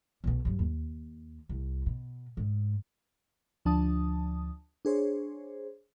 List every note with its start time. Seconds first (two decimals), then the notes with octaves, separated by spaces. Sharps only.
0.24 B1 B2
0.45 G2 F#3
0.59 D#2
1.49 C2
1.86 B2
2.37 G#2
3.65 D2 F3 D4 A5 D#6
4.85 D4 G#4 C5 C#5